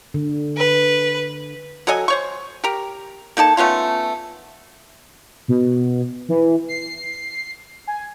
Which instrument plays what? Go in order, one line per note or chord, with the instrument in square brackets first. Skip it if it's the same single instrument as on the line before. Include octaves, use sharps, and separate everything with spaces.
[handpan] D3
[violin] B4
[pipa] F#3 A4 D#5 G#5
C5 C#5 C#6
G4 A#4
A#3 D#4 A4 A5
A3 B3 C#4 F4
[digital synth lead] B2
E3
C7
G#5